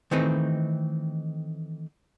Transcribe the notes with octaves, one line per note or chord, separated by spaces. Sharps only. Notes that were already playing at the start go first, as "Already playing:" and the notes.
D#3 E3 A3 C4 D#4 B4